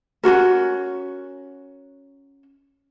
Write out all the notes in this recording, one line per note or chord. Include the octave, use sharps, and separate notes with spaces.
C#4 F4 F#4 A#4